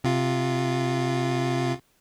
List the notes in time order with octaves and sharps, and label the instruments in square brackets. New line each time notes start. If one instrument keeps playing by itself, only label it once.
[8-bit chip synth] C3 F4